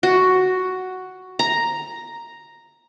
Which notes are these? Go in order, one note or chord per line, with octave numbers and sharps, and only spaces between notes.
F#4
A#5